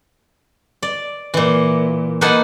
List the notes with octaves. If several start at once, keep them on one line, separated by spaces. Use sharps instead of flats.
D5
A#2 E3
A#3 D#4 B4 F#5 G#5 A5